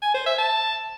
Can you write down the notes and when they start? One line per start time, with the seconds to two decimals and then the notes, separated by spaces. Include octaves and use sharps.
0.02 G#5
0.14 C5
0.26 E5
0.38 A5